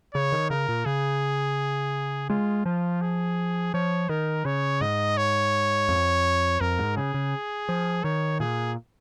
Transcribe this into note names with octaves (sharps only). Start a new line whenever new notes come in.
C#3 C#5
D#3
C#3 A#4
A#2
C#3 G#4
G#3 F4
F3 F4
G#4
F3 C#5
D#3 A#4
C#3 C#5
G#2 D#5
C#5
F2
F2 A#4
G#2
C#3 G#4
C#3
F3
D#3 C#5
A#2 G#4